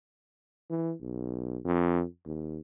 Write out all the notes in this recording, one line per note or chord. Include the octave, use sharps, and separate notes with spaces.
E3
B1
F2
D#2